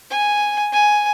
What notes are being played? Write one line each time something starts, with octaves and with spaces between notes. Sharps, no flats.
G#5
G#5